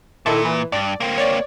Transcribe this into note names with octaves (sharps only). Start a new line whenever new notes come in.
A#2 D#3 E4 A4
E3
G2 D5
A#3 C4
C#5 D5